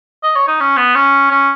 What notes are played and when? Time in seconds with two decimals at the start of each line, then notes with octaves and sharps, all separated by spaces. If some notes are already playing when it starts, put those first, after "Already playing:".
0.23 D#5
0.36 C#5
0.47 D#4
0.60 C#4
0.77 B3
0.95 C#4
1.31 C#4